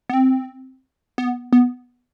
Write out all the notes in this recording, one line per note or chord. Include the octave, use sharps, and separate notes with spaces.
B3
C4
B3
B3